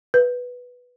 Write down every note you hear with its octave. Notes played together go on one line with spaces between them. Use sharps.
B4